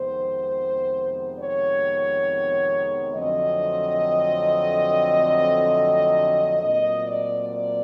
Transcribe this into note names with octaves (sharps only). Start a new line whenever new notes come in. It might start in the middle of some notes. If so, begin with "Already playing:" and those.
Already playing: F2 C3 D#3 G#3 B3 C5
C#5
F2 D3 F#3 A3 C4 D#5
A#2 F#3 A3 C4 D#5
D5
D5